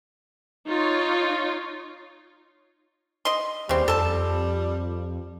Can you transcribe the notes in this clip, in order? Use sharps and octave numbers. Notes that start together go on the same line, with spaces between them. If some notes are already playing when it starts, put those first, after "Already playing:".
D#4 F4 C#5
D#5 C6
D#2 C#3 G3 C4
F2 A4 A5